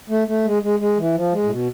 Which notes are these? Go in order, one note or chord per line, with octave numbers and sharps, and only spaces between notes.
A3
A3
G#3
G#3
G#3
E3
F3
G#3
A2
B2